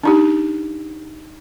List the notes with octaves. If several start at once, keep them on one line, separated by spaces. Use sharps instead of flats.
D4 D#4 G4